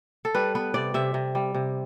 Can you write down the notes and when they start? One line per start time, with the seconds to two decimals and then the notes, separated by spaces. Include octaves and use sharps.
0.25 A4
0.35 G3 B4
0.55 B3 B4
0.74 C3 D5
0.94 C3 E5
1.14 C3
1.35 G3
1.55 C3